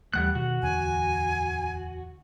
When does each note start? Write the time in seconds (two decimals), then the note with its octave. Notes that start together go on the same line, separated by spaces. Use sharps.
0.14 D#2 E3 G3 A3 F#5 F#6
0.35 B2 D#3 F#4
0.62 D1 E2 D3 G#5